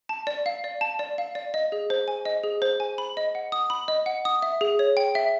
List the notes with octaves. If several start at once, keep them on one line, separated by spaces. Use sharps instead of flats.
A5
D5
F5
D5
A5
D5
F5
D5
D#5
G#4
C5
G#5
D#5
G#4
C5
G#5
B5
D#5
F#5
D#6
B5
D#5
F#5
D#6
E5
G#4
C#5
G5
E5